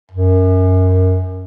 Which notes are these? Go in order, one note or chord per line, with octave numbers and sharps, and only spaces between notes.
F#2